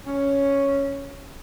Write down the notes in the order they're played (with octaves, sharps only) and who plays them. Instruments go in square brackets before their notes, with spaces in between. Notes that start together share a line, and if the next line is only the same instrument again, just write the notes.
[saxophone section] C#4